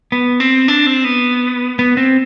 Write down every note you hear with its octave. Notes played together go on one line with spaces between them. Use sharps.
B3
C4
D4
C4
B3
B3
C4